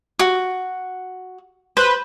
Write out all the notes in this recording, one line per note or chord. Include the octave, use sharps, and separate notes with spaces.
F#4
B4 C5